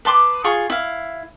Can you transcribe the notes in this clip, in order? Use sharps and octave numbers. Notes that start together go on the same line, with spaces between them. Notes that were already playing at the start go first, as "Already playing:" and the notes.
B4 A5 C6 D6
F4 G#4 C#6
E4 F5